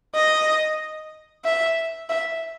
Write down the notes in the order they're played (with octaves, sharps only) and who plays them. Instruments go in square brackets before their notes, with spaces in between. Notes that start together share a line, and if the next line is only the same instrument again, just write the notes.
[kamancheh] D#5
E5
E5